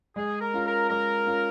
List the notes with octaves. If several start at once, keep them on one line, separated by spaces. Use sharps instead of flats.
G#3 G#4
A#4
C#4 F4
A#4
G#3 A#4
C#4 F4